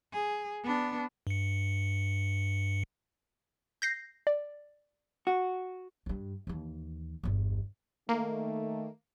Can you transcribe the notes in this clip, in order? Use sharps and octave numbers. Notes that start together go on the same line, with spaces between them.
G#4
B3 D4
G2 C#7
G6 A#6 C7
D5
F#4
G2 D#4
D#2 E3
G1 E2
D#3 A3 A#3